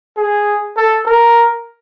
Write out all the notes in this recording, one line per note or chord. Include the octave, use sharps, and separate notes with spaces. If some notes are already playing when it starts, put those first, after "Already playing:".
G#4
A4
A#4